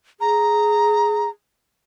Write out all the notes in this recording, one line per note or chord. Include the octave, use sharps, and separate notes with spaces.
G#4 A#5